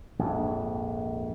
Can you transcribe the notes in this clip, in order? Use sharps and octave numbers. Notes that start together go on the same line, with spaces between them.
A#1 F2 G#2